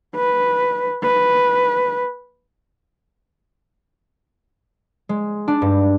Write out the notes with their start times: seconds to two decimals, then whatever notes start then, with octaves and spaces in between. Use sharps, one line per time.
0.15 B4
1.03 B4
5.09 G#3
5.48 D4
5.62 G2